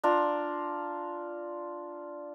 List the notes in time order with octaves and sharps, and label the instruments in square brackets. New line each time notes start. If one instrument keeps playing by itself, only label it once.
[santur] D4 F4 A#5